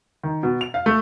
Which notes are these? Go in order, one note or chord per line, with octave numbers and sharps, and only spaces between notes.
D#3
B2
F7
F5
A3